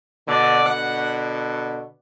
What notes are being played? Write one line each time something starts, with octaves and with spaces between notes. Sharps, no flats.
B2 D3 D5
B2 D3 F#5